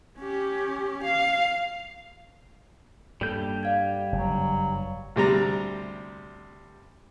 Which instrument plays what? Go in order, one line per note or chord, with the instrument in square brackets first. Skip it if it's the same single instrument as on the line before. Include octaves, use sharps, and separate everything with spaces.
[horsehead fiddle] C#4 G4
F5
[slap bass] G2 [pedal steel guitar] G3 G6 [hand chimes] A#3 A4
[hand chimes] D5 F5 G#6
[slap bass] F#1 G2 [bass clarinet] F#3
[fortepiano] D2 C3 G3 A#5